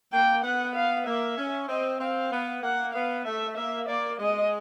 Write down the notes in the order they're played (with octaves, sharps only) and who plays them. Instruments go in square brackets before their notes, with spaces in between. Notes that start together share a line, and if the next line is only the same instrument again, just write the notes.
[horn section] A#3 [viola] G5
[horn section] B3 [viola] F#5
[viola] F5
[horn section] A#3 [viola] E5
[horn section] C#4
[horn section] C4 [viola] D#5
[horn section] C4 [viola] F5
[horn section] B3
[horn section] A#3 [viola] F#5
[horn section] B3 [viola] F5
[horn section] A3 [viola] E5
[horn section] A#3 [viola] E5
[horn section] A#3 [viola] D5
[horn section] G#3 [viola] D#5